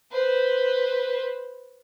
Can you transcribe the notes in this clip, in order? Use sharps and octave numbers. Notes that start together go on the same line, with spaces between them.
B4 C5